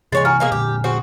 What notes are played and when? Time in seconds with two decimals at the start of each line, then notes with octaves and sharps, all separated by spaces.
0.12 C3 E3 G#3 A#3 C#5 G#5 A6
0.25 F#4 G#5 A#5 F6
0.40 B2 A#3 G#4
0.52 A#2 D3 G#3 G4
0.84 C4 F#4 G#4